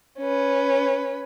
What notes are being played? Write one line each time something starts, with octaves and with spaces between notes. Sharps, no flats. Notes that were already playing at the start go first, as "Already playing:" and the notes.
C#4 B4